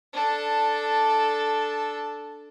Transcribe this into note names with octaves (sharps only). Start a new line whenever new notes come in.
D4 A4